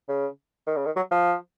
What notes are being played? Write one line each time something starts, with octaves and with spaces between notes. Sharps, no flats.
C#3
D#3
C#3
D#3
F#3
F3